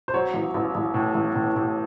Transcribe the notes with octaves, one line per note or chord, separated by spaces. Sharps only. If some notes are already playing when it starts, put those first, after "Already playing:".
C5
F#3 C#5
A1
A1
A1
A2
A1
A2
A2